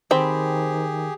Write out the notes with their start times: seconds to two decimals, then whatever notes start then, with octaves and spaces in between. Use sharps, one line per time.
0.11 D#3 C4 G4 G#4 B5